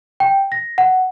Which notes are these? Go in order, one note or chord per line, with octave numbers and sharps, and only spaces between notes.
G5
A#6
F#5